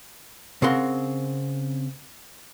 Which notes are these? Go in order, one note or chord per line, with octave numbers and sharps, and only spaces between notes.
C#3 C4 A#4 F#5 C6